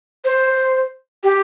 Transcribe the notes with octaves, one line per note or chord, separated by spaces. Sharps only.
C5
G4